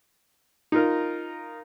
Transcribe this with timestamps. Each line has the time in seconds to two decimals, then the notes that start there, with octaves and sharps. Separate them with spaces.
0.72 D#4 F4 A#4